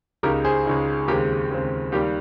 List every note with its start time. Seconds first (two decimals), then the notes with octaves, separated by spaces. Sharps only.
0.23 C#2 C#3 G#3 D#4 G4 A#4
0.44 G#4 C5
0.66 C#2 C#3 G#3 D#4
1.08 D#2 C#3 G#3 C4 G4 A#4
1.50 D#2 C#3 G#3 C4
1.92 D#2 D#3 G3 G4